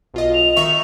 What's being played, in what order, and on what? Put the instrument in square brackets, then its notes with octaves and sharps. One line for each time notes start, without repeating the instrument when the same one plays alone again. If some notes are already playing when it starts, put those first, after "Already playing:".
[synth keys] B1 F4 D#5
[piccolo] F7
[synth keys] D#3 E5 C#6